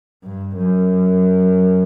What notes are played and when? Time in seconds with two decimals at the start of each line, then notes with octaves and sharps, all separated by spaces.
0.24 G2
0.56 F#2